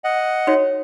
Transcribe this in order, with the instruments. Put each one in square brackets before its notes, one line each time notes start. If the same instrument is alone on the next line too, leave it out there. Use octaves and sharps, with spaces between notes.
[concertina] D#5 F#5
[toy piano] D#4 F#4 C#5